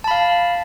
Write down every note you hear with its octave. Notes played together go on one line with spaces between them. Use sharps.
F5 A5 B5